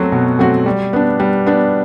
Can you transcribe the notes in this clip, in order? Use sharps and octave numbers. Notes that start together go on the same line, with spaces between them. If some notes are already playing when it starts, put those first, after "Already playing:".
Already playing: F#3 A3 C4 F#4
B2
F#3 A3 C4 F#4
G3
B3 D4
G3
B3 D4